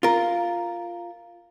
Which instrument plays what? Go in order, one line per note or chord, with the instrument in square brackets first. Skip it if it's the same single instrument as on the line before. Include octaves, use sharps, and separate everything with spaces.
[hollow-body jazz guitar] F4 A#4